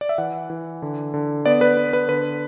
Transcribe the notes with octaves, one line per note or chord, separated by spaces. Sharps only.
D5
E5
E3 F#5
E3
D3
D3
B3 D5
B4
B3
B4
D3 B4